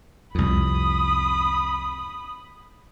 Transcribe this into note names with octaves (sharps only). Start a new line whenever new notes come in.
C2 F2 B5 D#6